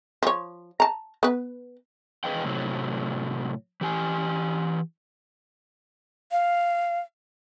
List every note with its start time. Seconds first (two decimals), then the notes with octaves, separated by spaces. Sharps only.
0.23 F3 C#5
0.80 A5 A#5
1.23 B3 B4
2.24 E2 G#4 B4 D#5 F5 G5
2.45 A2 C3 F#3 A3
3.81 E3 G4 G#5
6.32 F5